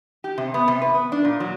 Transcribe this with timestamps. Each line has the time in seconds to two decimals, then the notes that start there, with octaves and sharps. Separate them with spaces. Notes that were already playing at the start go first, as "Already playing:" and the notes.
0.24 G4
0.38 C3
0.54 B3
0.68 C3
0.82 B4
0.94 B3
1.12 D4
1.25 A#2
1.40 F#3